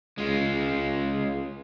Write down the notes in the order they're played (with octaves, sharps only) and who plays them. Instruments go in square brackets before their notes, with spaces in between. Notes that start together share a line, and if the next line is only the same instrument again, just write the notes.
[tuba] C#2 [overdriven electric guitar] G#3 F4